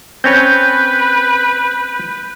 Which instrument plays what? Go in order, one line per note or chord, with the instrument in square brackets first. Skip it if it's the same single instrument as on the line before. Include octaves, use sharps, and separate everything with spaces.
[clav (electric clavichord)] C4 C#4 C#5 [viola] B4 [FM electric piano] G6